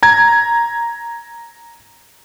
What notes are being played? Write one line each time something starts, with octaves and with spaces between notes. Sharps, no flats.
A#5 G#6